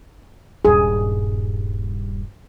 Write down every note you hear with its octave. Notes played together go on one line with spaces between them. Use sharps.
D#1 G2 G#4